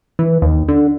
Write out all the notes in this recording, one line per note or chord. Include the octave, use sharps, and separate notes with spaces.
E3
D#2
D3